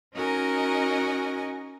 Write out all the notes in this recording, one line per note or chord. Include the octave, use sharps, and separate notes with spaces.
C#4 D#4 F#4 A#4 D#5 G#5